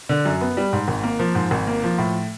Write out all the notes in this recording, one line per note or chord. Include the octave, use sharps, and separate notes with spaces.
D3
F#2
B3
G3
G#2
G#1
A#3
F3
G#2
G#1
A#3
F3
A2